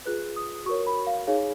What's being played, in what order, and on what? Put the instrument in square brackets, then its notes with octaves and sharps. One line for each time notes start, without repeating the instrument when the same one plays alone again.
[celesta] F4 G#4 B4 F#6
D#6
F#4 A#4 C#5 C#6
B5
F5
D#4 G#4 C#5 F5